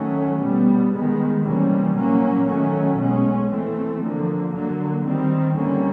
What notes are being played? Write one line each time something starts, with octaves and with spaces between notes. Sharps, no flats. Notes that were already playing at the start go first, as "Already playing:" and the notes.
Already playing: D#3 F#3 A3 C#4
B2 G3 B3
D#3 G#3 B3
C3 E3 G3 A#3 C#4
A#2 F#3 A#3 C#4
D#3 F#3 A3 C#4
B2 G#3 C#4
E3 A3 C4
D3 F3 A#3
D3 F#3 A#3
D#3 G3 C4
D3 G3 A#3 C#4